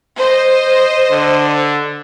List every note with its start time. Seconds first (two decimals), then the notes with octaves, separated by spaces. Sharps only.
0.16 C5 D#5
1.11 D3